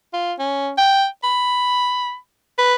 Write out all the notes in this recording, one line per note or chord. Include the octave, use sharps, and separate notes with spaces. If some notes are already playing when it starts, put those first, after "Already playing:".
F4
C#4
G5
B5
B4